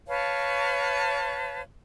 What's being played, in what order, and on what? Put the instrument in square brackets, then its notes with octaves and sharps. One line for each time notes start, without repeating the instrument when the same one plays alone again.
[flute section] B4 C#5 F5 A5